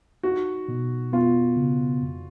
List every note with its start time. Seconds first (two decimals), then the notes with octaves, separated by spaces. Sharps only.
0.23 D#4 F#4
0.68 B2
1.13 B3 F4
1.56 C#3
2.01 F2